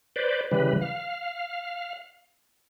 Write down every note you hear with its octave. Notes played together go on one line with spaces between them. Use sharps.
B4 C5 D5
C#3 E3 G3 B4
F5